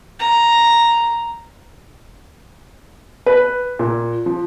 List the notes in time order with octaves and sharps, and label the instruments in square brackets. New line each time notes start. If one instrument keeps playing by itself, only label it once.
[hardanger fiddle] A#5
[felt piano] B4
A#2
F3